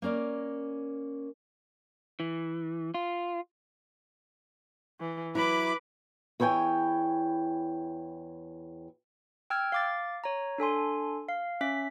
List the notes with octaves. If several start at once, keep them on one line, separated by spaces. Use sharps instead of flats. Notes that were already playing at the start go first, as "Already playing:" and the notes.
A#3 C#4 A#4 D5
E3
F4
E3
F#3 E4 B4 B5 D6
E2 E4 C#5 G5 G#5
G5 E6 F6 G#6
F5 D6 A6
C#5 A#5
D4 A4 G#5 C6
F5
C#4 E5 B6